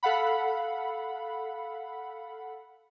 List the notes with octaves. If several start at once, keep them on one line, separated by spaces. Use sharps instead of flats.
A4 F5 F#5 B5